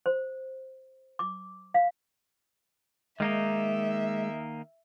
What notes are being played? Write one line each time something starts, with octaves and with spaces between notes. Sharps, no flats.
C5
D6
F5
D#3 G#3 A#3 D#4 E5